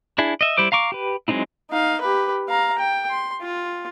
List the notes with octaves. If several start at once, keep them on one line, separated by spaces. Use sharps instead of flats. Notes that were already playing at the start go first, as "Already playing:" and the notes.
D4 E4 G#4
D#5 E5
G3 E4 C5 D6
F5 A#5 C#6 D6
G4 B4
F#3 G#3 C4 D#4 E4
D#4 F5
G4 B4
F5 A#5
G5
C6
F4